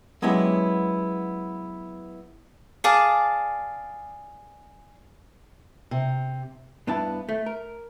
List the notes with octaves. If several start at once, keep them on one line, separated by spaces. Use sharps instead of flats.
F#3 G#3 B3 C#4 E4 G4
G#4 D5 F5 A5
C3
G2 B3 D4 E4 A5
A3
A#4